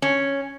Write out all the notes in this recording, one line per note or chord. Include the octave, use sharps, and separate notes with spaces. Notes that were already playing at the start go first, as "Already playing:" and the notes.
C#4